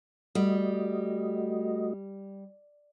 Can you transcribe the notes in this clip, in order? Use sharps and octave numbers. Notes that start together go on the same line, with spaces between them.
G3 A3 F#4 D#5